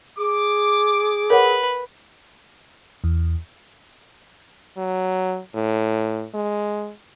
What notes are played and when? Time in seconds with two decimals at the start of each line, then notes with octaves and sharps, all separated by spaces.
0.18 G#4 D6
1.30 A#4 B4 C#5 F#5
3.04 E2
4.77 F#3
5.54 A2
6.34 G#3